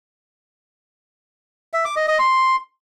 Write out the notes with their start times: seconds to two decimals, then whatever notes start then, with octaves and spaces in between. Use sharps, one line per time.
1.73 E5
1.85 D6
1.96 D#5
2.08 D#5
2.19 C6